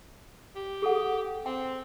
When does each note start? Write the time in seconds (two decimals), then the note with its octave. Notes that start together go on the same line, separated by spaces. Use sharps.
0.55 G4
0.82 G#4 A4 F#5
1.46 C4 G5